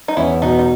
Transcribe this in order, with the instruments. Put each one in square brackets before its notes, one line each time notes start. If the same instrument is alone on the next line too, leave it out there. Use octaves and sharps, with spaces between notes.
[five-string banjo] D#4
[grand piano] E2 [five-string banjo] C#4 E4
[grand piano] B2 [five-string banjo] B3 D#4
[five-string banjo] D#4